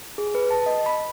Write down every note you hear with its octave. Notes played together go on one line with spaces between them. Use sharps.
G#4
B4
A5
D#5
B5